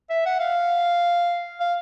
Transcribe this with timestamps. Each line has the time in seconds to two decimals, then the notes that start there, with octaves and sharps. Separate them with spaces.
0.10 E5
0.26 F#5
0.40 F5
1.60 F5